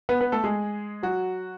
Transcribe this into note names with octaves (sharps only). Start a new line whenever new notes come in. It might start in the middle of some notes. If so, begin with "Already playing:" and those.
B3 B4
B3 B4
A3 A4
G#3 G#4
F#3 F#4